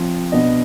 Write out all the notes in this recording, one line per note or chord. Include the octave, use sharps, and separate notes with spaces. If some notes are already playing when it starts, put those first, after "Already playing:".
Already playing: F3 C4
B2 B3 D4 D#5